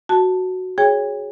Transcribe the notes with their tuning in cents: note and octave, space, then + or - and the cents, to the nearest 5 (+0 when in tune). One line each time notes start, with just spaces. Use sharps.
F#4 +0 A5 +5
G#4 +0 C#5 +0 G5 +40